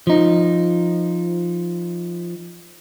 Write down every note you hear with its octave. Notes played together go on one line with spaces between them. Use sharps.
F3 D#4